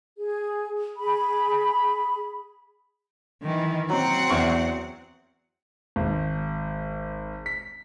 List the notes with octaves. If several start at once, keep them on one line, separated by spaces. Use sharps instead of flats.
G#4
G#4 B5
D#3 E3
F#3 C4 F#5
E2 C#6
G#1
B6